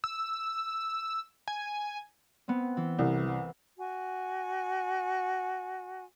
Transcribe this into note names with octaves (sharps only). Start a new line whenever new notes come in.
E6
G#5
B3 C4
E3
C2
E3
F#4 G#5